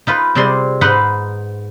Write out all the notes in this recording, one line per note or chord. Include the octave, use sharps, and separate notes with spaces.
D#4 F4 B4
C3 G3 C4 G#4 D5 C6
G#2 D#4 B4 F#5 C6